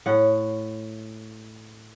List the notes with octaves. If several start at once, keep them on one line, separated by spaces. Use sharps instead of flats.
A2 F#5